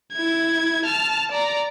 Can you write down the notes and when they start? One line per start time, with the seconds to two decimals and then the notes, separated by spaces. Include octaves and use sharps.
0.12 E4 G#6
0.85 A5 F6
1.31 D5 A#5